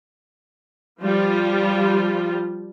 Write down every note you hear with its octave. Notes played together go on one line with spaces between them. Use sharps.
F3 G3 F4